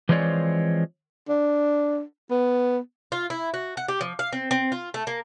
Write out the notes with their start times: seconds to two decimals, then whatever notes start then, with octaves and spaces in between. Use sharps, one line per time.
0.09 E3 F3 G#3 C4 C#5 D5
1.29 D4
2.30 B3
3.12 F4
3.30 E4
3.54 F#4
3.77 F#5
3.88 G4
4.01 F3
4.19 F5
4.33 C4
4.51 C4
4.72 F4
4.94 A3
5.07 A#3